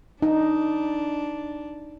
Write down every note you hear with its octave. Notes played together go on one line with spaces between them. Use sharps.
D4 D#4